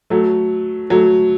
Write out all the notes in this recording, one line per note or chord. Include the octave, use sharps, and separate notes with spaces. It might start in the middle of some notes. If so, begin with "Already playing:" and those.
F#3 A3
F#3 A3